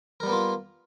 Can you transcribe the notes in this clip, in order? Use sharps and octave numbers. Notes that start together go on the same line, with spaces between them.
G3 A#3 B3 F4 A#4